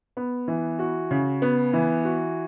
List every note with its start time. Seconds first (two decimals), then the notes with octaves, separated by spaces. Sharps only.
0.17 B3
0.48 E3
0.79 F#4
1.11 C#3
1.42 B3
1.73 E3
2.05 F#4